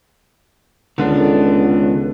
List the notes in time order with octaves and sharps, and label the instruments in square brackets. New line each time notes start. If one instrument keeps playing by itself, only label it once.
[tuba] C#2 [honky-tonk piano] D3 [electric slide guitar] D#3 B3 D4